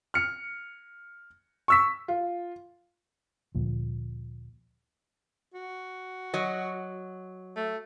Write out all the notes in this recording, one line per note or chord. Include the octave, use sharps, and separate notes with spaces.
F6 C#7
C#6 E6 B6
F4
D2 A#2 F3
F#4
F#3 D#5
A3